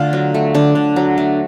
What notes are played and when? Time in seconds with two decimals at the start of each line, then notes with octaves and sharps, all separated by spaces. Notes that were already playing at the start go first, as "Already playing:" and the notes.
Already playing: D3 A3 F4
0.13 F#3
0.34 A3
0.54 D3 D4
0.75 D3
0.96 F#3
1.18 A3